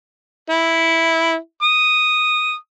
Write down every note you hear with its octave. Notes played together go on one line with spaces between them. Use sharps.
E4
D#6